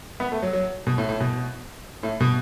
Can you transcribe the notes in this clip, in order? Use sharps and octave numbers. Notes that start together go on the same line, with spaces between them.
B3
A3
F#3
F#3
B2
A2
A2
B2
A2
B2